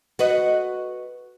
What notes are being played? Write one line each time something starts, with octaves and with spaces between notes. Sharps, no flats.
F#4 B4 D#5